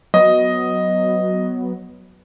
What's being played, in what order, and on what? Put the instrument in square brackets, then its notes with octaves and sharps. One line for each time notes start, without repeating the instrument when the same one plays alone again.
[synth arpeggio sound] F#3 B3 [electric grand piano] D#5